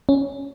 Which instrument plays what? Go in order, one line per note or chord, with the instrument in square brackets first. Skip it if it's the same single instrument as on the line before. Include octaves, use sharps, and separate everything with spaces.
[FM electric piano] C#4